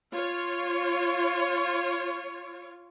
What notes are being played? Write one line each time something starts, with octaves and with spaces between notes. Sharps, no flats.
F4 C#5